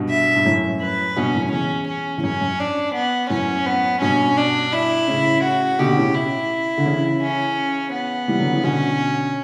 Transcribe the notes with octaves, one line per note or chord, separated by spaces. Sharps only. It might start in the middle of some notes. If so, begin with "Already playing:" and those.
Already playing: G2 B2
E5
G2
F#2 A2
B4
G2 B2 C#4
F#2 A2
E2 C#4
C#4
E2
F#2 C#4
F#2
D4
B3
F#2 A2 C#4
B3
G2 B2 C#4
D4
E4
A2 C#3
F#4
B2 D3 G4
A2 C#3
E4
D3
C#3 E3
C#4
B3
E3 G3
D3 F#3
C#3 E3
B2 D3 C#4